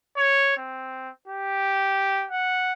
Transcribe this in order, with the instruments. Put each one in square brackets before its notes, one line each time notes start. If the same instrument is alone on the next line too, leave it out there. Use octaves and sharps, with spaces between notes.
[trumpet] C#5
C4
G4
F#5